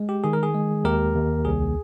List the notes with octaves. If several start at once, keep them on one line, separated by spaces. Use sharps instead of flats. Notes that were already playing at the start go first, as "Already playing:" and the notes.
Already playing: G#3
G4
D#3 G#4
A#4
G#4
G#3
D#2 G4 A#4
D#2
C2 G#4